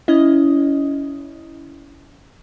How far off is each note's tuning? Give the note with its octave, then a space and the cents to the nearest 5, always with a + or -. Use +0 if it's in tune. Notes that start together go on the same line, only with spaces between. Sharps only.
C#4 +25 E4 +0 D#5 +0